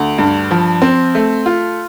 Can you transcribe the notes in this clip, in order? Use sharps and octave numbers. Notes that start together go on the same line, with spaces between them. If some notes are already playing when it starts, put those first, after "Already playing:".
Already playing: D2
G2
F3
C4
A3
F4